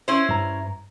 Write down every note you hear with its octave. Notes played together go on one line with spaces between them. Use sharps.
C#4 E4 C5
G2 A#5